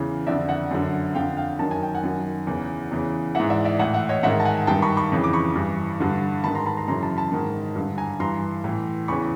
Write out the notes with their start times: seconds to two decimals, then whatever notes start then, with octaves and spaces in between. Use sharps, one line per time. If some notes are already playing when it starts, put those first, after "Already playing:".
Already playing: E2 C#3 E3
0.27 F2 D3 D5 E5
0.49 E5 F#5
0.71 F#2 D3
1.15 F2 D3 F5 G5
1.37 F5 G5
1.59 F#2 D#3 A5
1.71 G#5
1.83 G5
1.95 F#5 G#5
2.03 F#2 D#3
2.47 E2 C#3 E3
2.91 E2 C#3 E3
3.35 G#2 E3 E5 F#5
3.50 D5 E5
3.65 D5 E5
3.79 A2 E3 E5 F#5
3.94 E5 F#5
4.09 C#5 D#5
4.23 G#2 D#3 E5 F#5
4.40 A5
4.45 F#5 G#5
4.67 G2 D#3 G5 A5
4.82 B5 C#6
4.97 B5 C#6
5.12 F2 C#3 E3
5.24 D6
5.33 B5 C#6
5.56 G2 E3
6.00 G2 D3
6.44 G#2 D#3 A5 B5
6.55 A#5 C6
6.66 A5 B5
6.77 A#5 C6
6.88 F#2 C#3 E3 A#5 C6
7.03 A5 B5
7.17 A5 B5
7.32 G#2 D#3
7.75 G2 D3
7.98 G#5 A#5
8.20 G2 E3 A#5 C6
8.64 A2 E3
9.08 E2 C#3 E3 B5 C#6